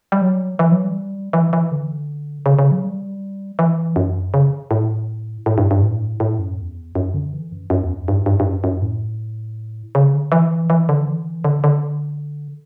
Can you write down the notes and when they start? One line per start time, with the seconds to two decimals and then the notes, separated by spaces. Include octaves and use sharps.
0.12 G3
0.21 F#3
0.59 E3
0.71 F#3
0.84 G3
1.33 E3
1.53 E3
1.72 D3
2.46 C#3
2.59 C#3
2.71 F#3
2.84 G3
3.59 E3
3.96 F#2
4.34 C#3
4.71 A2
5.46 A2
5.58 G2
5.71 G2
5.83 A2
6.20 A2
6.39 F#2
6.58 E2
6.95 F#2
7.14 D3
7.33 E3
7.52 F#2
7.70 F#2
7.82 E2
7.95 F#2
8.08 G2
8.26 G2
8.40 G2
8.45 F#2
8.64 F#2
8.82 A2
9.95 C#3
10.14 D3
10.32 E3
10.70 E3
10.89 D3
11.07 E3
11.44 D3
11.64 D3